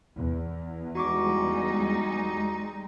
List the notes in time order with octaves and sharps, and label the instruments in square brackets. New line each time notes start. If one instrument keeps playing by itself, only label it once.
[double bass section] E2
[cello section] G3 G#3 [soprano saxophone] D#4 [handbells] F#4 C#6 D6